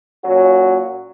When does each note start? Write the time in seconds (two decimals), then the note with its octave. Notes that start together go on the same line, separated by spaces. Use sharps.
0.25 A#2 F#3 C#4 F#4